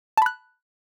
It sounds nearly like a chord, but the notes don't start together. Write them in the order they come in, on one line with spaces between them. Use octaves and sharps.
A5 B5 F#6